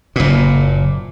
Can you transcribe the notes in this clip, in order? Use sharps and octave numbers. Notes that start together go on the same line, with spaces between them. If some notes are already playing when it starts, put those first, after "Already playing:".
F#1 A#2